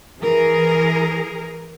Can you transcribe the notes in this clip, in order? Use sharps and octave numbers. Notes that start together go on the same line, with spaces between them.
E3 G#4 A#4